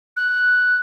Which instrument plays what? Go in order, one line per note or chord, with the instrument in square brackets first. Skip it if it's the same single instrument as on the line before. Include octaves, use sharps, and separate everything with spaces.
[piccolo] F#6